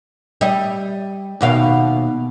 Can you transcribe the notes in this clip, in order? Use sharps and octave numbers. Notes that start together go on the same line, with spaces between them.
G3 D#5
D#2 B2 F5